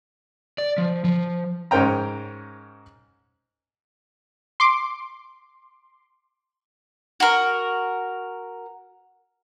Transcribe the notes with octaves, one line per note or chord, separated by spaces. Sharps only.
D5
F3
F3
G#2 C#4 A#4 C5 G5 A#5
C6 D6
F#4 A#4